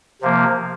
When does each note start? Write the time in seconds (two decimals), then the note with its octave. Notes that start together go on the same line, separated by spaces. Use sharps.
0.21 C3 F3 A#3